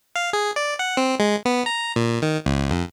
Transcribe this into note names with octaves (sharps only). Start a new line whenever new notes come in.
F5
G#4
D5
F#5
C4
G#3
B3
A#5
A#2
D#3
C#2
F2